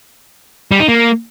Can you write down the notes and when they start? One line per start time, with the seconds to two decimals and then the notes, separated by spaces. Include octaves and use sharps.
0.71 G3
0.80 D#4
0.88 A#3